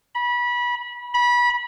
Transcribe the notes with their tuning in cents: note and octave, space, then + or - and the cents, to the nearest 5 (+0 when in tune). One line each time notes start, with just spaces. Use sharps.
B5 -25
B5 -25